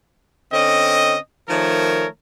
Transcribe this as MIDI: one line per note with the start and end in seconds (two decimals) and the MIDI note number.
0.53 1.15 50
0.53 1.15 60
0.53 1.15 61
0.53 1.15 75
1.49 2.06 51
1.49 2.06 53
1.49 2.06 57
1.49 2.06 70
1.49 2.06 73